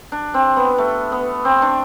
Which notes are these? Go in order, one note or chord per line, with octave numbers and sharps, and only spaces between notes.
D4
C4
B3
A3
B3
C4
D4